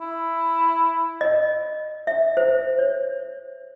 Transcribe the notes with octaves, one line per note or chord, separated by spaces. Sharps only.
E4
D#5
E5
C5
C#5